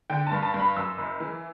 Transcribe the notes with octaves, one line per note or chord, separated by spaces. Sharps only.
D3 G5
A5
G2
A5
G2
B5
F#2 E6
F#1
E3